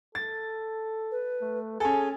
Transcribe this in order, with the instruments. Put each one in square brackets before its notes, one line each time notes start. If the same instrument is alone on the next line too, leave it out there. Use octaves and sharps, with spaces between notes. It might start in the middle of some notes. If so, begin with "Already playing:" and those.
[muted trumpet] A4 [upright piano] A6
[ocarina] B4
[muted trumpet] A3
[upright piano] C#4 A4 [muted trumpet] G#4 [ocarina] G#5